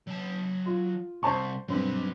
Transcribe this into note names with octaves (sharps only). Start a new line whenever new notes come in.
F#3 A5
F4
C2 C5 A5 C#6
G2 F#3 C4 B4